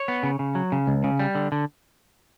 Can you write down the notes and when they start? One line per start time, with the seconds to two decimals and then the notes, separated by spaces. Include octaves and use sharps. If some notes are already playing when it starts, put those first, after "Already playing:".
Already playing: C#5
0.08 B3
0.23 C#3
0.39 C#3
0.55 F#3
0.72 C#3
0.87 C#2
1.04 C#3
1.19 G3
1.35 D3
1.52 D3